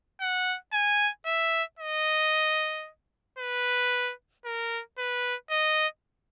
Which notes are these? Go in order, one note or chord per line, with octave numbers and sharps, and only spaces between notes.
F#5
G#5
E5
D#5
B4
A#4
B4
D#5